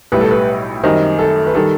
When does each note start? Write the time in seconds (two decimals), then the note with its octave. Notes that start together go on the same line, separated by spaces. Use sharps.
0.12 B1 A2 G3 B4
0.21 A4
0.31 B4
0.83 F#2 D#3 G3 C4 D#5
1.19 A4
1.47 B4
1.54 D#3 G3 A4